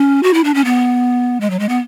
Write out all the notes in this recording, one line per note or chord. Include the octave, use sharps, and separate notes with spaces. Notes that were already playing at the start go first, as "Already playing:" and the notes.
Already playing: C#4
F#4
E4
D4
C#4
B3
G#3
F#3
G#3
B3